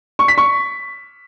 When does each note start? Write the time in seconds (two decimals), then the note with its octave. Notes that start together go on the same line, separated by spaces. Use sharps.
0.19 C#6
0.28 B6
0.38 C#6